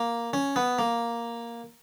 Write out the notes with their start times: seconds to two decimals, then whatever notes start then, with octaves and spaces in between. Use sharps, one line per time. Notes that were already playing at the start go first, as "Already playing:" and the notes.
Already playing: A#3
0.33 C#4
0.56 B3
0.79 A#3